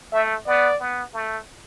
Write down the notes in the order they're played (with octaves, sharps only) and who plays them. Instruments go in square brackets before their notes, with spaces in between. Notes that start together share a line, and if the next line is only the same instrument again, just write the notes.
[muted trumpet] A3 [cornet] E5
[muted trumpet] B3 [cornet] D5
[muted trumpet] B3
A3